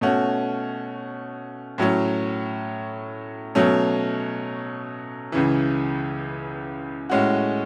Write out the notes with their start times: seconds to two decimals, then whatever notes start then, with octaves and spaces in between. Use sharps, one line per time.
0.01 B2 A3 C#4 F#4
1.78 A2 F#3 C#4
3.55 B2 F#3 A3 C#4
5.32 C#2 C#3 E3
7.09 A2 G#3 C#4 F#4